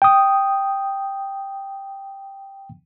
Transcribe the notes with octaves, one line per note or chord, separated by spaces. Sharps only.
G5 D#6